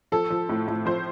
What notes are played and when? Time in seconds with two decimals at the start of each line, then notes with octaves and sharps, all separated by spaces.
0.12 F3 A4
0.30 F3
0.49 A2
0.68 A2
0.86 F3 C5